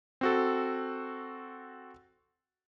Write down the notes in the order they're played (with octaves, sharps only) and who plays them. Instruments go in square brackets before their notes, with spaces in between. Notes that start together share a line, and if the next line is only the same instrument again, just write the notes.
[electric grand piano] C4 F#4 A4